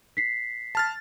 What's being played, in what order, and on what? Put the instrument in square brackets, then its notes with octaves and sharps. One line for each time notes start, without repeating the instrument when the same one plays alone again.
[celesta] B6 C7
[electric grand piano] A5 F6 A6